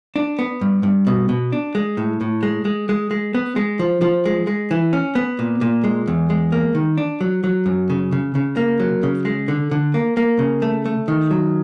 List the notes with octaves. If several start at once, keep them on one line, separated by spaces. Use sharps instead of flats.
D4
B3
G2
G2
B2
B2
D4
G#3
A2
A2
G#3
G#3
G#3
G#3
B3
G#3
F3
F3
G#3
G#3
E3
C#4
B3
A#2
A#2
G#3
E2
G#3
A#3
D#3
D4
F#3
F#3
F#2
C#3
C#3
C#3
A#3
F#3
C#3
G#3
D3
D3
A#3
A#3
C#3
A3
A3
D#3
F#3